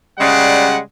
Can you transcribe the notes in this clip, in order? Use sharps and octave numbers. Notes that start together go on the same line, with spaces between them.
C#3 G3 G#3 D5 F#5